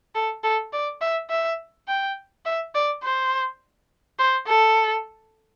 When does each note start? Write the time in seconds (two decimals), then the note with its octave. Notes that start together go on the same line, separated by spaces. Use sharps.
0.15 A4
0.43 A4
0.73 D5
1.01 E5
1.30 E5
1.88 G5
2.45 E5
2.75 D5
3.03 C5
4.19 C5
4.47 A4